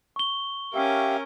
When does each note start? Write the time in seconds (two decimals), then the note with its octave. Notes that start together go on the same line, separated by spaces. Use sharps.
0.16 C#6 G7
0.74 C#4 G4 A#4 E5 F5